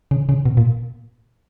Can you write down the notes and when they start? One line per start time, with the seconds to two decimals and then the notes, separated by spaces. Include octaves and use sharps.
0.11 C#3
0.29 C#3
0.45 B2
0.57 A#2